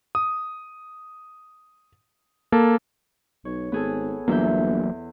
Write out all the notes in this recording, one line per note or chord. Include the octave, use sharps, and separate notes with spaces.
D#6
A#3 A4 A5
B1 C#5
G#1 B3 G#4 A4
G1 E2 E3 F#3 A#3 E5 G6